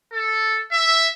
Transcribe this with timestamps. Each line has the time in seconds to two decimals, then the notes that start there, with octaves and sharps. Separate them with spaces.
0.12 A4
0.72 E5